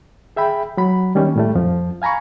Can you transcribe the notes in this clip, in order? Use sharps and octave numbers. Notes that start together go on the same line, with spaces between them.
G#4 E5 G5 B5
F#3 B5
D#3 G3 A#3 C#4
A2 G3 A3
F2 F3
F5 G#5 A#5 B5 C#6